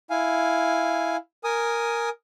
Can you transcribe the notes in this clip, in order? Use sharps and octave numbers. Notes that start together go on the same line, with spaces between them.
E4 F5 G#5
A#4 G#5 D#6